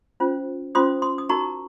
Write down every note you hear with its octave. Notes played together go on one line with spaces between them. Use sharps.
C#4 F4 C5
C#4 F4 C5 C6 D#6
C6 D#6
D#6
D#4 F#4 A#4 A#5 C#6